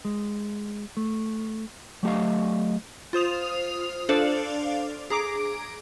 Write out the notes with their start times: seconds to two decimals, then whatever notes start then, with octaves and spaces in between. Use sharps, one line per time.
0.05 G#3
0.97 A3
2.03 F#3 A3 G4 D#5 F5
3.13 F4 C5 D#6 F7
4.09 D4 A4 C5 D5 F5
5.10 G#4 A#5 D6 D7